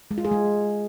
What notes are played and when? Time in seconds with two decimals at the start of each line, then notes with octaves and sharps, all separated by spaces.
0.11 G#3
0.18 F4
0.25 G#4
0.32 G#3